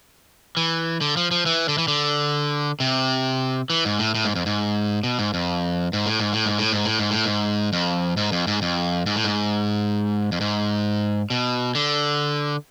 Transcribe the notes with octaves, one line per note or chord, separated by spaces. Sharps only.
E3
D3
F3
F3
E3
D3
E3
D3
C3
E3
G#2
A2
A2
G#2
F2
G#2
B2
G#2
F2
G#2
A2
G#2
A2
G#2
A2
G#2
A2
G#2
A2
G#2
F2
G#2
F2
G#2
F2
G#2
A2
G#2
F2
G#2
B2
D3